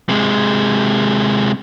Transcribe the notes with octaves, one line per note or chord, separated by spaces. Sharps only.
C3 G#3